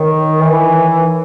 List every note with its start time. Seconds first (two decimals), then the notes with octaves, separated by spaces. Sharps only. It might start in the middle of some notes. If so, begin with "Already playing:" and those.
Already playing: D#3 D#4 A#4 C#5
0.41 E3